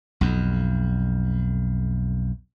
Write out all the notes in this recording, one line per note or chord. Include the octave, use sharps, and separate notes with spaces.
B1 F2